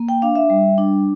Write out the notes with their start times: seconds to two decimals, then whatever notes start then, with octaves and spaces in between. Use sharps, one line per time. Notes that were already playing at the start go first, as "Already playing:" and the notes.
Already playing: A#3
0.09 G5
0.22 D4 F5
0.35 E5
0.50 G3
0.78 D4